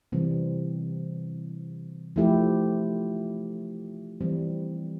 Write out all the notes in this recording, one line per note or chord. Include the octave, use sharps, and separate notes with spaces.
C3 E3 G3 C4
F3 A3 E4 G4
E3 G3 C4